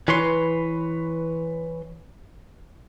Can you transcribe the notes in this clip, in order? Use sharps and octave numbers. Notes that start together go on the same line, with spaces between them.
E3 B4 C#5 C6